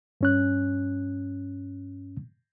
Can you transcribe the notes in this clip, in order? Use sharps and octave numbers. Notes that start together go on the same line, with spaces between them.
G2 C#4 F#6